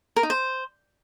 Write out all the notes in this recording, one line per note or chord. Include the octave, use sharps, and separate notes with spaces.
A#4
D#4
C5